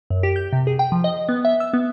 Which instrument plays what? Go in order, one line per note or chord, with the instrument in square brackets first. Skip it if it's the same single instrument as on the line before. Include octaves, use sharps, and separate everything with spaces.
[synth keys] F#2
G4
G6
C3
G#4
G5
F3
D#5
B3
E5
E6
B3